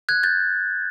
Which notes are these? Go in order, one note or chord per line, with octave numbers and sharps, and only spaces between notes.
F#6 G#6
G6 A6